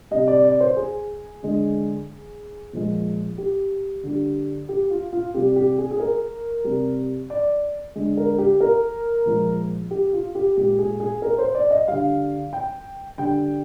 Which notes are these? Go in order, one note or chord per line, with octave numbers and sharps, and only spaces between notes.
C3 G3 D#5
D5
D5
C5
G#4
D3 G#3
A#2 F3 G#3
G4
D3 G3
G4
F4
F4
C3 G3 G4
G4
G#4
G#4
A#4
C3 G3
D5
D3 G#3
A#4
G4
A#4
A#2 F3 G#3
G4
F4
G4
A#2 G#3 G4
G#4
G#4
A#4
C5
D5
D#5
D3 G3 F5
G5
D3 G3 G5